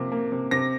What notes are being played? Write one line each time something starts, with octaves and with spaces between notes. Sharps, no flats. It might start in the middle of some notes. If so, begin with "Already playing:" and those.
Already playing: C3 F3 A#3
A#3
C3
C3 A#6